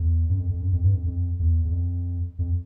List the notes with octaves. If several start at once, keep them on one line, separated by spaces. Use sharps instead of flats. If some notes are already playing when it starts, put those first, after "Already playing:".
Already playing: E2
F#2
F2
F2
F#2
F2
G2
F2
F2
E2
E2
F2
F2